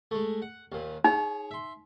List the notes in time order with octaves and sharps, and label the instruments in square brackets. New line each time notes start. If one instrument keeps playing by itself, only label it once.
[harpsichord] G#3 A3
F#5
D#2 A#2
[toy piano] D#4 [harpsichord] G#4 C#5
[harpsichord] E5 C6